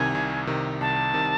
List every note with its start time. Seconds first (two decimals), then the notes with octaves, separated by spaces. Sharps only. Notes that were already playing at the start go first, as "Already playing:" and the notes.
Already playing: C2 C3 D#3 G#5
0.15 C2
0.47 C3 D#3
0.81 C2 A5
1.14 C3 D#3